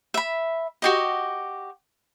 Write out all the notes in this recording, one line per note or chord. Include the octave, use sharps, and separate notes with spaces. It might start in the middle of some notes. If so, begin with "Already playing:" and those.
E5 B5
F#4 G4 D#5